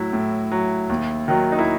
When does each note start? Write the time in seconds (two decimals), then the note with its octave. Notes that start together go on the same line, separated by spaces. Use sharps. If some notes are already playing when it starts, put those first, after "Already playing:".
Already playing: A2 F#3 E4
0.13 A2
0.52 F#3
0.89 D#2
1.28 D#3 F#3
1.52 D#4
1.59 E4